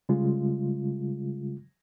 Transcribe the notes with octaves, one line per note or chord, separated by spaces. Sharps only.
C#3 G3 G#3 F4